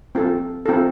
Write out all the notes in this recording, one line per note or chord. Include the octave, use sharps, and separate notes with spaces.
C4 F4 A4
C4 F4 A4